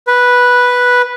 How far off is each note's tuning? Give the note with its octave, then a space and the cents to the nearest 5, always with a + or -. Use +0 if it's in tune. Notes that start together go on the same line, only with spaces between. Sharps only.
B4 -5